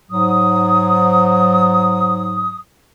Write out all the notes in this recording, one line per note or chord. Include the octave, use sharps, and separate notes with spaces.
G#2 F#3 D#6